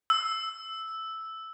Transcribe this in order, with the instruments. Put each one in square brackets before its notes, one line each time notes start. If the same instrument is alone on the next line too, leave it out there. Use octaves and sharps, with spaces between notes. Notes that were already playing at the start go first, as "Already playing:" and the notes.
[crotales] E6